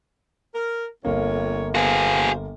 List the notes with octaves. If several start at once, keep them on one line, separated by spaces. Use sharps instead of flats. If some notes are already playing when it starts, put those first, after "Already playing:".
A#4
G1 F2 A#3 C#5
B2 F#4 G#4 C5 F5